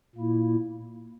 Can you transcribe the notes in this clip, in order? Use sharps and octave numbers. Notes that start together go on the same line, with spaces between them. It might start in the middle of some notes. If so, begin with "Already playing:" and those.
A#2 A#3 E4